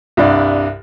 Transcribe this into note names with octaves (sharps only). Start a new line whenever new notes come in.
C2 G2 D5